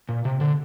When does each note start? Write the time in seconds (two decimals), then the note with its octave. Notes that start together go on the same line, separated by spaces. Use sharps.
0.09 A#2
0.25 C3
0.41 D3